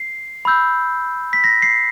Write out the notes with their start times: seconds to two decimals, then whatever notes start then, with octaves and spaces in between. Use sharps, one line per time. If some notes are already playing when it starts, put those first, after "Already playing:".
Already playing: C7
0.45 B5 E6 G6
1.33 B6
1.44 A#6
1.62 C7